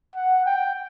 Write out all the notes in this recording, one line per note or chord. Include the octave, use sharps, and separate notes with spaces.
F#5
G5